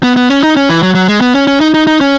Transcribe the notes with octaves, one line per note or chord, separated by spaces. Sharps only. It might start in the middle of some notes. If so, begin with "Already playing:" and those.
B3
B3
C#4
D#4
C#4
E3
F#3
F#3
G#3
B3
C#4
C#4
D#4
D#4
D#4
C#4